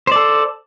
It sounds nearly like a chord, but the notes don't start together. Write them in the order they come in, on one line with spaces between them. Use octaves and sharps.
C5 D5 A4